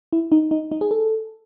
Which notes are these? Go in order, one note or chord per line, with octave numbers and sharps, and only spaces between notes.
E4
D#4
D#4
D#4
G#4
A4